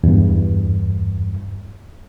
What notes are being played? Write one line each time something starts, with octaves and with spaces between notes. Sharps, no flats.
E2 G2